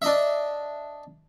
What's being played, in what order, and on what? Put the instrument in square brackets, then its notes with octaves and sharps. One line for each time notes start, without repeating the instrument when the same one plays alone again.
[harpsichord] D4 D#5 E5